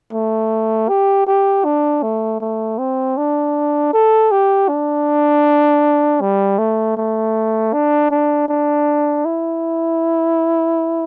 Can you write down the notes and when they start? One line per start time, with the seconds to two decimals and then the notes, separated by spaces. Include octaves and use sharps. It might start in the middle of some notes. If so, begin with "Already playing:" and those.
0.13 A3
0.89 G4
1.27 G4
1.65 D4
2.03 A3
2.41 A3
2.78 C4
3.17 D4
3.94 A4
4.31 G4
4.69 D4
6.21 G3
6.59 A3
6.97 A3
7.73 D4
8.11 D4
8.48 D4
9.25 E4